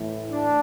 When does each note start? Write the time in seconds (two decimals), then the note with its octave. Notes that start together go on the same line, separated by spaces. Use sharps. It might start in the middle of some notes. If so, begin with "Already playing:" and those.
Already playing: A2 E3
0.28 D4